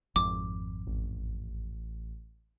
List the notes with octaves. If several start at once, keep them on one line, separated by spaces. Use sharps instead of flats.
G#1 F2 D6
A1